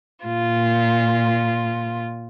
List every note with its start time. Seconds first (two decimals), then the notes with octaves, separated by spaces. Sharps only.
0.24 A#2 F4